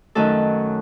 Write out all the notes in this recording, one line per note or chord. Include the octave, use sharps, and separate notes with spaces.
F#2 D#3 F#3 A3 C#4 A4